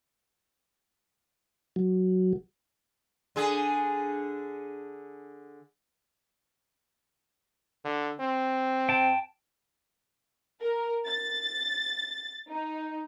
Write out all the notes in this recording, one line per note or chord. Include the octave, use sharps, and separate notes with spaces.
F#3
D3 G#4
D3
C4
G5 A5
A#4
A6
D#4